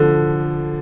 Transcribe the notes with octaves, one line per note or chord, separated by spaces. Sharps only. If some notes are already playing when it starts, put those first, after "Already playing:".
Already playing: D3 F3